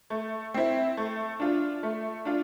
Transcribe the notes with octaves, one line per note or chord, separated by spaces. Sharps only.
A3
C4 E4
A3
D4 F4
A3
D4 F4